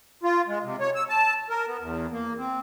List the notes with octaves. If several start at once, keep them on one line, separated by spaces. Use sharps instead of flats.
F4
G#3
C3
C#5
E6
A5
A#4
B3
E2
A#3
C4